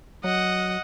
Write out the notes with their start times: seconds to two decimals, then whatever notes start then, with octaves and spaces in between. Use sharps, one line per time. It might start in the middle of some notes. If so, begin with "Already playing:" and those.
0.24 F#3 D#5 F#5